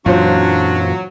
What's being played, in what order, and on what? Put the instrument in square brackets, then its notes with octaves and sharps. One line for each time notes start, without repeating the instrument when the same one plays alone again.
[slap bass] F#2 A#2 E3 [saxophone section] F#3 [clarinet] D4 [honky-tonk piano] F4 C5